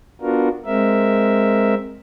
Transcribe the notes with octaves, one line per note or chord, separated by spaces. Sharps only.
B3 D4 F4 F#4 A#4
G#3 C4 A#4 E5